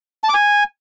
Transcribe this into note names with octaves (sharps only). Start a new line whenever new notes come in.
A5
D6
G#5